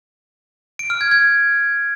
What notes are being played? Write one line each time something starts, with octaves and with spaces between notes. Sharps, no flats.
D7
F6
G#6
G#6